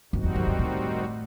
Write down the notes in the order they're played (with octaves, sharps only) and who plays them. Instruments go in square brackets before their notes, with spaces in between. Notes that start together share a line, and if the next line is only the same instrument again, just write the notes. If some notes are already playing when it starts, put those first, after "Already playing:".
[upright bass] F#2 [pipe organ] D#3 G3 C4 D#4 F#4
[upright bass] E2
F#2
F#2
A2